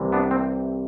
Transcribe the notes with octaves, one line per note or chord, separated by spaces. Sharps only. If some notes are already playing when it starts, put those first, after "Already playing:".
Already playing: C2 C3 E3
B3 D4
C4